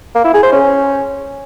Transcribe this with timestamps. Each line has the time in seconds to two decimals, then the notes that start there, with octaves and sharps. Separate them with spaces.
0.15 A#3
0.24 E4
0.34 G#4
0.43 C5
0.52 C#4